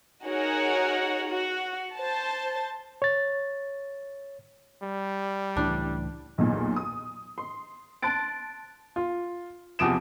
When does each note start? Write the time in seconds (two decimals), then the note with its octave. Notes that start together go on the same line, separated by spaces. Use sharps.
0.24 D#4 F#4 G#4 A#4 C#5 F#5
1.30 F#4
1.96 C5 A5
3.02 C#5 A6
4.83 G3
5.57 C#2 A2 E3 D4
6.38 B1 E2 A#2
6.76 D#6
7.38 C6
8.02 A5 C6 F#6 A6 D7
8.96 F4
9.79 E2 C3 F3 D#6 D7 E7